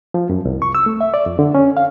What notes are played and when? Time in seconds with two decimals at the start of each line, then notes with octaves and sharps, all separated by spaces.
0.14 F3
0.30 F#2
0.45 C2
0.62 C#6
0.75 E6
0.86 A3
1.01 E5
1.14 D5
1.26 F2
1.39 D3
1.55 C#4
1.77 F5